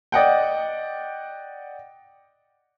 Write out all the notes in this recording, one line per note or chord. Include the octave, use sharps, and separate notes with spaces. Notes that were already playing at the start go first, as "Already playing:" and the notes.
D5 D#5 F#5 G5